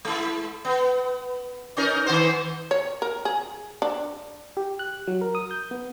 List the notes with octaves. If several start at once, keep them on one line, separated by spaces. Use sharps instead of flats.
G#3 E4
B3
C#4 D#4 A#4
D#3 B3 C5
C#5
A#4
G#4
D4
G4
F#6
F#3
A#4
D#6
G6
B3